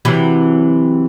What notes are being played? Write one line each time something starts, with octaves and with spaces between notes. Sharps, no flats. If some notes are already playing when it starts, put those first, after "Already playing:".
C3 E3 F#3